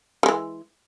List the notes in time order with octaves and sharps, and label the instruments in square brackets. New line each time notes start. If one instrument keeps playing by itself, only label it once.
[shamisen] G3
G#3
E3